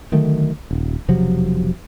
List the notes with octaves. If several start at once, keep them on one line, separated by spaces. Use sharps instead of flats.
D3 D#3 F#3 A3
D#1
E1 C3 F3 F#3